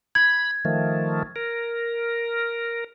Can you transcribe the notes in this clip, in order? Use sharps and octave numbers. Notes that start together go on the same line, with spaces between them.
B5 G#6
D#3 F3 A3
A#4